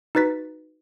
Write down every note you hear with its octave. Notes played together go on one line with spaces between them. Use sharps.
D#4 F#4 B4 A6 B6